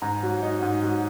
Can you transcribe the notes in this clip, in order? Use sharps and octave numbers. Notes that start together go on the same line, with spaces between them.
G#2 A#5
F#3
D#4
G#2
F#3